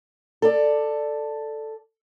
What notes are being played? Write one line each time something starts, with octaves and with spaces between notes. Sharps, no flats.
A4 D5